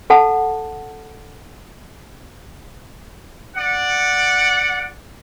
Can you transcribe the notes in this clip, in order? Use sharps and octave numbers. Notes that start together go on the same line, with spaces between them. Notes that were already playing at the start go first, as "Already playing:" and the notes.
A4 F#5 A5
D5 F#5